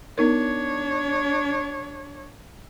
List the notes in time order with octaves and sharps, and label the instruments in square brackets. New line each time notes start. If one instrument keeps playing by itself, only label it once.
[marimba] B3 D#4 A#4 [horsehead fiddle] D4 C#5